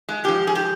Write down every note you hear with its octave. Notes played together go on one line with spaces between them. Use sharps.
G#3
G#2 F3 G4
G#4
G4